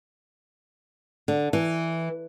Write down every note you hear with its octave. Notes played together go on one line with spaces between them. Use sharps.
D3
E3